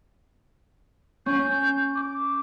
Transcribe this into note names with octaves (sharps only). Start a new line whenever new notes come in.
C#4 G6
D6